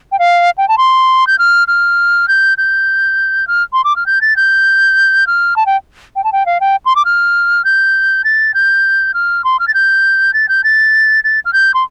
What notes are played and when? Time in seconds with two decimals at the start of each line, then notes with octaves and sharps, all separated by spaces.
0.12 G5
0.19 F5
0.58 G5
0.68 A5
0.78 C6
1.27 G6
1.38 F6
1.68 F6
2.28 G6
2.58 G6
3.47 F6
3.73 C6
3.84 D6
3.96 F6
4.06 G6
4.21 A6
4.36 G6
5.27 F6
5.56 A5
5.66 G5
6.16 G5
6.24 A5
6.32 G5
6.46 F5
6.60 G5
6.85 C6
6.96 D6
7.05 F6
7.64 G6
8.24 A6
8.54 G6
9.14 F6
9.44 C6
9.59 F6
9.68 A6
9.74 G6
10.34 A6
10.48 G6
10.64 A6
11.24 A6
11.45 F6
11.53 G6
11.74 C6